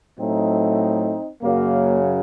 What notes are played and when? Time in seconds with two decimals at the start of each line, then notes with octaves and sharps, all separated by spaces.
0.18 A2 F#3 A3 C4 D#4
1.42 F#2 C#3 F#3 A#3